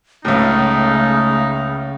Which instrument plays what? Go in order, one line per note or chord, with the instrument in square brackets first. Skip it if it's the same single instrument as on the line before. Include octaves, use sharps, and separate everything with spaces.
[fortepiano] C#2 A2 [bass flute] C#3 [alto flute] A3 [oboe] D#4